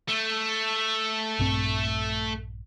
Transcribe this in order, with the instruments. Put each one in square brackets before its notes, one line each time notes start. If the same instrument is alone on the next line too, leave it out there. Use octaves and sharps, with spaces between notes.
[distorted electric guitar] A3
[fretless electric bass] A#1 G2 C4